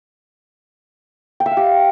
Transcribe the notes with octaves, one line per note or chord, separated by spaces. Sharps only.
G5
E5
F5
G4